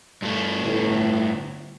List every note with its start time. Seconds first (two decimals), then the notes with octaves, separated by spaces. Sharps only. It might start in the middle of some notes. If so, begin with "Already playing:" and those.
0.22 G2 A3
0.61 G1 A2